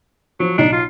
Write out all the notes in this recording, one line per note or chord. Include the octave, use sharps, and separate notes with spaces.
F3 F#3
B1 D4 D#4 C7
F4